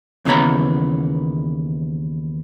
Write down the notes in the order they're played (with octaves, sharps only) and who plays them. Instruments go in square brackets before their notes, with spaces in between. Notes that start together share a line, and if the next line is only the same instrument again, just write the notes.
[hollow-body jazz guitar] D#2 C#3 E3 B3 A#5 B5